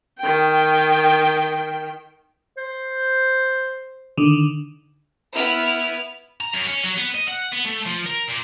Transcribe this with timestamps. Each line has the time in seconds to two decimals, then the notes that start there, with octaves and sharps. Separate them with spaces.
0.19 D#3 G5
2.57 C5
4.18 D3 D#3
5.35 B3 E4 F6
6.40 A#5
6.53 F#2
6.67 C#4
6.84 F#3
6.97 B3
7.14 D#5
7.28 F#5
7.53 B3
7.65 A3
7.86 F3
8.06 A#4
8.28 A#2